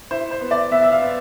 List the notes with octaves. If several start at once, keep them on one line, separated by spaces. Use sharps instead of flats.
E4 C5
C5
B3
D5
B3 E5
E5
F5
B3